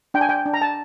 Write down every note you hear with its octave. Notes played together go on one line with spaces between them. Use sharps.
D4 G5
G#5
G5
D4
A#5
A5